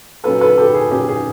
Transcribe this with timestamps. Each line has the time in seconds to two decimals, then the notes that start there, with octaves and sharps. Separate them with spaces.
0.24 A#2 F#3 A#3 C#4 A4 B4
0.41 A4 B4
0.58 G4 A4
0.74 G#4
0.91 A#2 F#3 A#3 C#4 G4
1.09 G#4